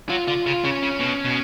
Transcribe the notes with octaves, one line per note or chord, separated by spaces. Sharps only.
F#3 F4
D3 F4
C#3 F4
C#3 C#4
C#3
B2
B2